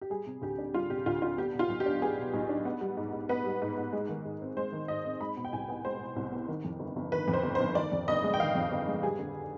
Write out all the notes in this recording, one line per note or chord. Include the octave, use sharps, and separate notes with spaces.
G4
G3 G#4
C3
D2 G4
D4
G3 F4
C3 G4
D2 F4
D4 F4
B3 G4
B2
F4
B1
G4
D4
B3 G#4
B2
B1
D4
B3
G3
G#2
G#2
B3 B4
G3
G#2
G#2
G#3
D#3
G#2
C4
G#3 C5
D#3
G#2 D#5
C4
G#3 B5
B2
G5
C2 G#5
B3
G#3 C5
B2
C2
B3
D#3
F2
G1
G1
D#3 B4
F2
C5
G1
C5
G1
D#3 D5
F2
G1 D#5
G#3
G5
D#3 F5
F2
G1
G#3
G3 G#4
D3